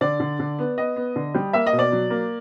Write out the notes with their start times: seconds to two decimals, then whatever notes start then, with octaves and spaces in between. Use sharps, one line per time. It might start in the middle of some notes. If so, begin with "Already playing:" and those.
0.01 D3 D5
0.20 D3
0.39 D3
0.59 B3
0.78 B3 D#5
0.96 B3
1.16 D3
1.35 G3
1.53 A#3 E5
1.66 D#5
1.72 B2
1.79 D5
1.92 F#3
2.10 A#3